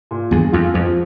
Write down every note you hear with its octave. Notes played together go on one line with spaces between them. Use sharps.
A#2
E2 G2 G#4
F2 F4
F2 F3